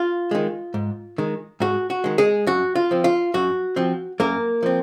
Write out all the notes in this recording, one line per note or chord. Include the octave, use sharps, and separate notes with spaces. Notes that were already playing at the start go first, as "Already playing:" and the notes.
Already playing: F4
D#3 G#3
G#2
D#3 G#3
G#2 F#4
F#4
D#3 G#3
G#3 G#4
F#2 F#4
F4
F3 C4
F4
F#2 F#4
F3 C4
F#2 A#3 A#4
F3 C4